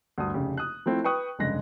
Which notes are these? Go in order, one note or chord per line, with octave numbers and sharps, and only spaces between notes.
D2 G2 D#6
F1 C#3 G4
D#6 F#6
F3 A3 C4 E4
B4 G5 C#6 D#6 F#6
F1 G2 C#3 G#3 F#6 A#6